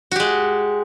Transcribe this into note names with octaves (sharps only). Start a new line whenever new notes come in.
G#3 F#4 G4